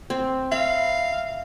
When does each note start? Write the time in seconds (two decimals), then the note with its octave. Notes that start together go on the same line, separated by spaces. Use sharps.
0.10 C4
0.52 E5 F5 B5